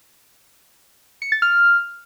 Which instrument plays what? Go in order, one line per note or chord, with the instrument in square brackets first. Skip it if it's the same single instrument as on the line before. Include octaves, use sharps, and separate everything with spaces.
[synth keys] C#7
A6
F6